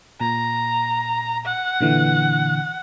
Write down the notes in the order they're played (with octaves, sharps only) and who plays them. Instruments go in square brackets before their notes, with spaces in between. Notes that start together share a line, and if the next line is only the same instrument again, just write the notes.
[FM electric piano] A#2 [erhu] A#5
[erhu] F#5
[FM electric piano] A#2 D3 E3